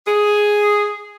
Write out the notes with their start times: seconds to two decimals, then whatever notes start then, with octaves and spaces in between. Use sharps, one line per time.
0.07 G#4